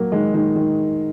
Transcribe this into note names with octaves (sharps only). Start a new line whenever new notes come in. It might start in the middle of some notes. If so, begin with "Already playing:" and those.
Already playing: F#3 A#3
D#3 G#3
D#3
D#3